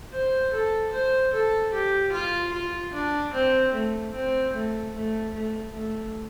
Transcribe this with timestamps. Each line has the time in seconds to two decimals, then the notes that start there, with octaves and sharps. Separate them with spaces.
0.12 C5
0.53 A4
0.92 C5
1.33 A4
1.73 G4
2.12 F4
2.52 F4
2.93 D4
3.33 C4
3.73 A3
4.13 C4
4.53 A3
4.93 A3
5.33 A3
5.73 A3